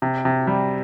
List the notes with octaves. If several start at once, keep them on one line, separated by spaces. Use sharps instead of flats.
C3
C3
G3